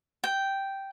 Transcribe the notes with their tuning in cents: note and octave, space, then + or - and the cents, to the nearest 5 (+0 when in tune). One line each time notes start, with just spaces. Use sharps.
G5 -5